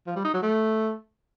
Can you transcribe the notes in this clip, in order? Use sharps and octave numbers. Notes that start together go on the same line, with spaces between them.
F3
G3
D#4
F#3
A3